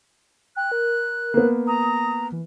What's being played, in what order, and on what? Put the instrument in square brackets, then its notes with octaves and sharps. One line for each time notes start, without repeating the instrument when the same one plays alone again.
[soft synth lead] G5 [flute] F#6
[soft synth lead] A#4
[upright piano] A#3 B3
[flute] A#5 [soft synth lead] D#6
[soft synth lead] E3